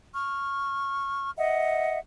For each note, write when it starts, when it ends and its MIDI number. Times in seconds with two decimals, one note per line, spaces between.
0.13 1.30 85
0.13 1.30 89
1.38 1.99 75
1.38 1.99 76
1.38 1.99 78